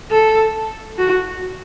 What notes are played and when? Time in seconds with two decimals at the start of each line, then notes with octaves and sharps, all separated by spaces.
0.11 A4
0.98 F#4